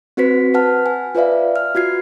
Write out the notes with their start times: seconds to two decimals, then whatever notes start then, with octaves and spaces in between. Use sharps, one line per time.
0.17 C4 F#4 B4 C5 B6
0.54 B4 C5 F#5 A5 F6
0.86 G#5
1.15 F4 B4 C5 D5 E5 F5
1.56 F6
1.75 F4 F#4 G#6 C7